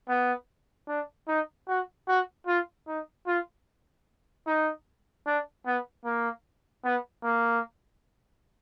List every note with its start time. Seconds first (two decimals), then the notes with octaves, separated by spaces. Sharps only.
0.08 B3
0.88 D4
1.28 D#4
1.68 F#4
2.08 F#4
2.47 F4
2.87 D#4
3.27 F4
4.47 D#4
5.26 D4
5.66 B3
6.05 A#3
6.84 B3
7.24 A#3